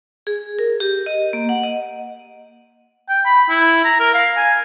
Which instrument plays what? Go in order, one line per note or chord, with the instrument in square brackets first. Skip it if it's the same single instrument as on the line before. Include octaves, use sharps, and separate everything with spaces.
[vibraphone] G#4
A#4
G4
D#5
A#3
F#5
D#5
[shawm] G5
B5
E4
A#5
A#4
F5
G#5